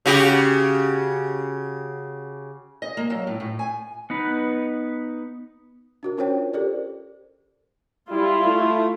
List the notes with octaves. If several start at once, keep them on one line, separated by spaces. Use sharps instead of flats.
C#3 F#4 G4
D#5
A#3
F#3
A2
A2
G#5
B3 D#4 B4
D4 F#4 A#4
C#4 F4 A#4 C5 C#5 G5
G4 A4 A#4 C5 D5
G3 E4 F4
A3